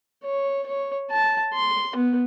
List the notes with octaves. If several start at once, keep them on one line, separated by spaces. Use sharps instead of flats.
C#5
C#5
A5
C6
B3